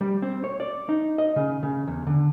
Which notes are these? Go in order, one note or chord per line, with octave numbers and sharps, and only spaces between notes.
G3
C4
C#5
D5
D#4
D#5
C#3
C#3
E2
D3